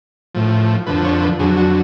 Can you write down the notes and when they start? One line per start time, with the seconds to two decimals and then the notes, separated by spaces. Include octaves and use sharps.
0.35 A2 F3
0.86 F2 D3 F3 B4
1.04 C#5
1.22 B4
1.39 F2 D3 F#3 G#4
1.57 F#4